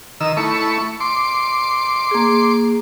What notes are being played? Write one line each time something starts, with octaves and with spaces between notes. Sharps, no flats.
D#3 E6
A3 E4 C#6
C6 D6
A#3 G#4